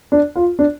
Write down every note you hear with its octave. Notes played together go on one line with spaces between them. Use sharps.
D4
F4
D4